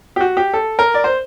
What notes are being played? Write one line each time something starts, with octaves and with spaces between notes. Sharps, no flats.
G4
F#4
G4
A4
A#4
D5
C5